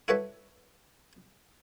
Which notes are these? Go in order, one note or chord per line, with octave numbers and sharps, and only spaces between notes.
E4 F#4 A4 B4 C#5 E5